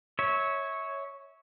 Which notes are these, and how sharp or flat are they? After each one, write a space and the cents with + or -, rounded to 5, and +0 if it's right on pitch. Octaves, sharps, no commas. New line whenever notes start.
C#5 +0 E5 -25